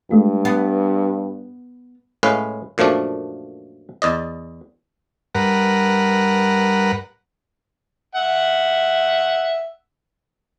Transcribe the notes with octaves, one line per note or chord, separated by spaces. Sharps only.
G2 G#3 A3 F4
B3
A2 G#3 C#4 B4 F5
F#2 A#2 F3 A3 D4
E2 D5 D#5
G2 A#4 B4 F#5
E5 F#5